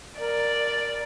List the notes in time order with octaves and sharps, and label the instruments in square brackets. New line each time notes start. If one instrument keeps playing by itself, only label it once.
[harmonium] A#4 [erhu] D5